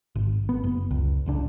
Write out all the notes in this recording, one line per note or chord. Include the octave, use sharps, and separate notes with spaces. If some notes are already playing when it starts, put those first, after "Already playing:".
G#1
B3
F#1
C#2
D1 C#2 D4